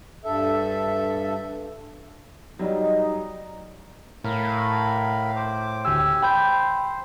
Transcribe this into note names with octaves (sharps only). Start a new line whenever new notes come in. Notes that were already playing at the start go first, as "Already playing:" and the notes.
G2 A4 E5
F#3 G3 D#4
A2 A#4 F5 B5
C5 D6
D2 G4 G#5 E6
C5 G5 B5 G6